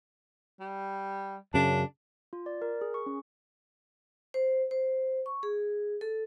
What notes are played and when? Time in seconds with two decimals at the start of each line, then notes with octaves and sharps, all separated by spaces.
0.60 G3
1.54 F#2 C#3 D4
2.33 F4
2.46 D5
2.62 A#4
2.81 G#4
2.94 C#6
3.06 C#4
4.34 C5
4.71 C5
5.26 C#6
5.43 G#4
6.01 A4